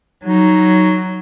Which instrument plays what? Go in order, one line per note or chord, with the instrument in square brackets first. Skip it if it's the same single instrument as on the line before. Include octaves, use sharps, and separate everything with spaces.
[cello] F#3 [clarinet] D#4